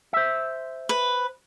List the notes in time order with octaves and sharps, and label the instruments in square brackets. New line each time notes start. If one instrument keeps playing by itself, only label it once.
[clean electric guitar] C5 E5
[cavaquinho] B4